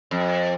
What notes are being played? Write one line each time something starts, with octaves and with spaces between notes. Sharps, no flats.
F2